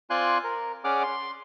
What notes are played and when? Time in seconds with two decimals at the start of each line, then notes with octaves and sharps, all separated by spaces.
0.10 C4 F4 D5 G#5 C6 F#6
0.44 A#4
0.84 C#4 G#4 D5 F#5 D6 F6
1.03 C6